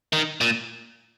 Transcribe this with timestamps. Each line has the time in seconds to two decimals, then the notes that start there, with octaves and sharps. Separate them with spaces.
0.13 D#3
0.41 A#2